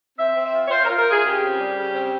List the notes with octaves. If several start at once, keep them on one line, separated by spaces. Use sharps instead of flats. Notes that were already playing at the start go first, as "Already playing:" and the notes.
C4 E5
C4
E5
F4
C#5
F4 C5
A#4
F4
A#4
F4 G#4
C#3 G4
C4
G3
C#3
C4